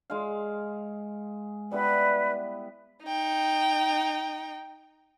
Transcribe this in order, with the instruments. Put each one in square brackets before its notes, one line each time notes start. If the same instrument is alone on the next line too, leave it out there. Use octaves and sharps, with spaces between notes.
[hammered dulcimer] G#3 G#4 F5
[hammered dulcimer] G3 B3 E4 [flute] B4
[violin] D#4 G5